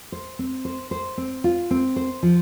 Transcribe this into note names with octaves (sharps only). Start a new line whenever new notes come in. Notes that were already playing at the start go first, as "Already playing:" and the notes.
C5
C4
C5
C5
C4
F4
C4
C5
F3